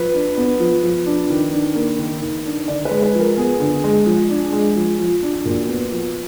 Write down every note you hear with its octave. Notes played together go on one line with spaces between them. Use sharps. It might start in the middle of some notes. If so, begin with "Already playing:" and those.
Already playing: F3 B4
D4
B3
F3
F3
D4
D#3
D4
A#3
D#3
D#3
D4
D3 D5
B4
G#3
B4
F3
A#4
B3 G#4
D3
G#3
F3
D4
G#3
F3
F3
D4
A#2 F#4
B3
F3